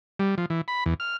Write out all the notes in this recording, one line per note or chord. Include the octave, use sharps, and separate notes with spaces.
G3
F3
E3
B5
E2
F6